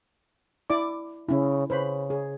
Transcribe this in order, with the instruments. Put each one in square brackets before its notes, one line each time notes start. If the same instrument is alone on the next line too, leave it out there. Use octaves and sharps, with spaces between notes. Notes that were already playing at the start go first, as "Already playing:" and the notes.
[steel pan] E4 D5 D6
[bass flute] C#3 [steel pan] C#4 E4
[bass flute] C#3 [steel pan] B4 C5 B5
[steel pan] G#4